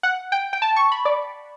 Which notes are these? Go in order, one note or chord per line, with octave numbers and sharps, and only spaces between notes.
F#5
G5
G5
A5
C#6
B5
D5